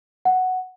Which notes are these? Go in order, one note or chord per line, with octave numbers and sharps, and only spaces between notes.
F#5